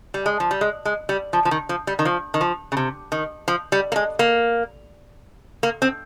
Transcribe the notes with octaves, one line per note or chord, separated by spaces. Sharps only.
G3
G#3
F3
G3
G#3
G#3
G3
F3
F3
D#3
F3
G3
D#3
F3
D#3
F3
C#3
C3
D#3
F3
G3
A#3
G#3
A#3
A#3
C4